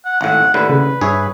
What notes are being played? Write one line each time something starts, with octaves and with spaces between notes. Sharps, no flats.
F#5
G#1 A2 F#5
D#2 A2 D3 B4
C#3 B4
G2 G#4 C#5 E5